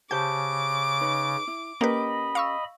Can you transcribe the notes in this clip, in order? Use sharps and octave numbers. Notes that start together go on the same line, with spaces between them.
C#3 G4 C5 A5 D6 G6
D#4 B4 C#5
E4
A#3 C#4 G4 A#4 B4 D#5 B5
F5 C#6 E6